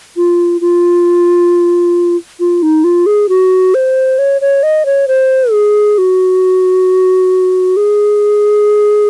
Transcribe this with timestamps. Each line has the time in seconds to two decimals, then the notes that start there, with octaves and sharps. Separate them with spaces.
0.17 F4
0.61 F4
2.40 F4
2.62 D#4
2.84 F4
3.06 G#4
3.29 F#4
3.74 C5
4.18 C#5
4.41 C#5
4.63 D#5
4.86 C#5
5.08 C5
5.52 G#4
5.98 F#4
7.77 G#4